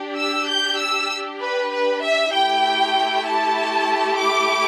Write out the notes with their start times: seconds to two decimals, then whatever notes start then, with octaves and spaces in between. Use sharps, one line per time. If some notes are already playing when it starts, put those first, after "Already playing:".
Already playing: D4 G4
0.18 E6
0.49 G6
0.79 E6
1.42 B4
1.72 B4
2.03 E5
2.34 A3 E4 G4 G5
3.26 A5
4.19 D6